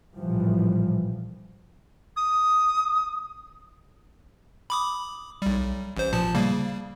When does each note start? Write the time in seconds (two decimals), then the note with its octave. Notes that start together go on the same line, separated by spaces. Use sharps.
0.15 A#1 A2 E3 F3 G3
2.17 D#6
4.70 B5 D6 D#6
5.42 B1 G3
5.97 A1 C5
6.13 A#2 F3 A5
6.34 C#3 G3 A#3